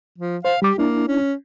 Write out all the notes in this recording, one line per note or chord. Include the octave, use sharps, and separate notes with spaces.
F3
C5 F5
G3 G4 D6
A#3 D4 E4
C#4